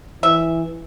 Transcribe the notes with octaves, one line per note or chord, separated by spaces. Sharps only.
E3 E5